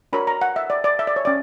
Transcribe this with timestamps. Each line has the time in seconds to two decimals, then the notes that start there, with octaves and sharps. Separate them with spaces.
0.13 D4 F#4 A#4 C#5 B5
0.27 A#5
0.41 F#5
0.56 E5
0.70 D5
0.84 D5
0.99 E5
1.07 D5
1.16 C#5
1.25 C#4 D5